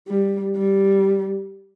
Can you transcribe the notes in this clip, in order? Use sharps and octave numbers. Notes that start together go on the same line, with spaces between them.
G3
G3